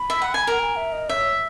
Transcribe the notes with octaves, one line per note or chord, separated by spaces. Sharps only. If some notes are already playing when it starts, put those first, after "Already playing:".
Already playing: B5
E5
F#5
G#5
A#4 F#5
G#5
E5
D#5
C#5 E5